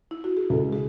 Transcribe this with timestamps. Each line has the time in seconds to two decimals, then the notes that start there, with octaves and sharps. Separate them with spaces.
0.11 E4
0.24 F#4
0.37 G#4
0.50 C#2 A4
0.72 G#4